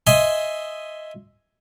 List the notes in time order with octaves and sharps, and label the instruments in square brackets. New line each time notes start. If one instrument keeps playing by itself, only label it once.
[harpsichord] D#5 E5 G#5 C6